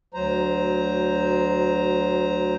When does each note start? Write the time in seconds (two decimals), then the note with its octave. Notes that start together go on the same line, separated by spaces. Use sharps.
0.14 D2 F#3 C5 A#5